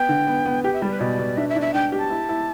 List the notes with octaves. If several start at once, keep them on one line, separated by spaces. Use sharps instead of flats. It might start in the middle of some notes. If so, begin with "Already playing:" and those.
Already playing: B3 G5
D3
B3
B3
G4 G5
E5
G3 D5
B4
B2 D5
B2
D4 E5
E5
D4
E5
D4 G5
G4
A5
E4
E4